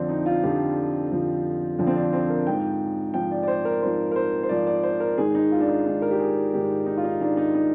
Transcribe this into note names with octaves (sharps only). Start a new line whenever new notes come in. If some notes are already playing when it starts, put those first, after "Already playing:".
Already playing: F2 D3 F3 C4 D4
D#4
F4
F2 D3 F3 G4
F2 D3 F3
F2 D3 F3
C4
D4
C4
A#4
G#2 F3 G5
G#2 F3 G5
D5
D5
C5
A#4
G#2 F3 C5
A#4
C5
C5
G#2 F3 D5
D5
C5
A#4
G#2 D#3 G#4
D#4
F4
D4
D#4
G#2 D#3 D#4
A#4
G4
G#4
G#2 D#3 G4
D#4
F4
D#4
G#2 D#3 D4
D#4
D#4